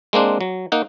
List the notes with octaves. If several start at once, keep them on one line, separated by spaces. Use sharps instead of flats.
G#3 A#3 C4 D4
F#3
A#3 D#4 F#5